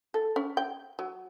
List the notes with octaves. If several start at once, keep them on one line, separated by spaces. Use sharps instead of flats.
A4
C#4
G5
F#3